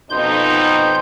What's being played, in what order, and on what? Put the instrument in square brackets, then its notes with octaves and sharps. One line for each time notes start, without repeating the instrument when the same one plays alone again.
[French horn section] F2 B2 D#4 [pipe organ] C6 G6